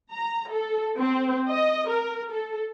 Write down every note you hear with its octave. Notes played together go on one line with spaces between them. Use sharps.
A#5
A4
C4
D#5
A#4
A4